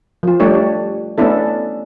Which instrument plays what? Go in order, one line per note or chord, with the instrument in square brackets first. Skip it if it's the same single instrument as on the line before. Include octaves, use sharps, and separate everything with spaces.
[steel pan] F3 F4
G3 A3 D4 G4 C#5
A3 B3 C#4 D4 E4 A4